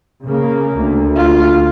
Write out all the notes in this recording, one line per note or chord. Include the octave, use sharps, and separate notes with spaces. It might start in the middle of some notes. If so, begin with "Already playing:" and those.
C#3 A#3
D2
F4